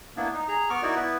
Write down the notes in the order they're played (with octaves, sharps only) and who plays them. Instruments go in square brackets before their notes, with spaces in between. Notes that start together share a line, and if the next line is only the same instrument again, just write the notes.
[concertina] A#3 B3 D4 E4
D#4
G#4 A#5
B3 C#6 D6 F6
D#4 E4 F#4 A#4 D5
B3 E4 B4